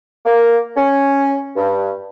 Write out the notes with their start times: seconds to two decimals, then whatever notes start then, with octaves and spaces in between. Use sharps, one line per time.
0.25 A#3
0.76 C#4
1.56 G2